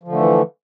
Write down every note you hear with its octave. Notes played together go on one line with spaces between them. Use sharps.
D3 E3 F3 A3